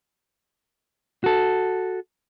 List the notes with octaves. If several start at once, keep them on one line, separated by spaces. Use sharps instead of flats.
F#4 A4